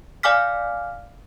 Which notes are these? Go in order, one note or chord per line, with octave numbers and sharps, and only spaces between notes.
D5 F5 G#5 D6 F6 B6